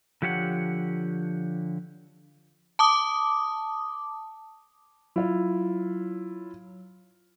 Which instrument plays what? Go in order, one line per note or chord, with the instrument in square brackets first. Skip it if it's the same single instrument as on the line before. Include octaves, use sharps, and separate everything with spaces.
[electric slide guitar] D3 F3 G4 C#5 F5 F#5
[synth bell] A5 D6 D#6
[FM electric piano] F#3 [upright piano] E4 F4